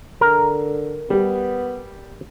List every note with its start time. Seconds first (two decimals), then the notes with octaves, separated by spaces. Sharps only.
0.21 D3 A#4
1.10 G3 B3